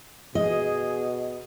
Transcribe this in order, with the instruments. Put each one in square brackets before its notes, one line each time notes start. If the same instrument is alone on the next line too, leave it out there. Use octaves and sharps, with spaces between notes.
[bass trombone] B2 [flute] G#4 [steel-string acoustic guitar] D#5